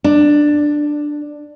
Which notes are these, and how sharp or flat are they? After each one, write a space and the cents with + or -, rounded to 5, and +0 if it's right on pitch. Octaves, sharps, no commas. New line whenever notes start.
D4 +10